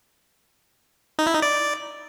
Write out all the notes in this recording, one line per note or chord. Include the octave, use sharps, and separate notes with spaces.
D#4
E4
D#4
D5